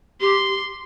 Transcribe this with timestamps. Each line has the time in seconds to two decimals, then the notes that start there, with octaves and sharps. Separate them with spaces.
0.21 G4 C6